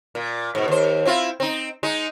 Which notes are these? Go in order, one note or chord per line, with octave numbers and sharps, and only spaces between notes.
A#2
G#2 B2
D#2 C5
C4 E4 F4
C4 D#4
G#3 D#4